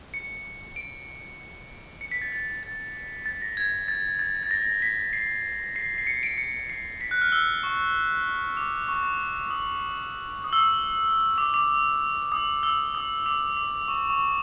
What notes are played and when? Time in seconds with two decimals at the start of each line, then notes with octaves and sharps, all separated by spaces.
0.14 C#7
0.76 D7
2.01 C#7
2.12 B6
2.22 A6
2.32 A6
2.63 A6
3.26 A6
3.42 A#6
3.57 G#6
3.88 A6
4.19 A6
4.43 A6
4.51 A#6
4.66 A#6
4.82 B6
5.13 C7
5.76 C7
5.98 C7
6.07 C#7
6.23 D7
6.38 C#7
6.70 C7
7.01 B6
7.11 F#6
7.22 F6
7.32 E6
7.63 C#6
8.57 D6
8.89 C#6
9.51 D#6
10.44 D#6
10.53 E6
10.61 D#6
11.38 D6
11.54 D6
12.32 D#6
12.63 E6
12.95 D#6
13.26 D6
13.57 D6
13.88 C#6
14.10 C#6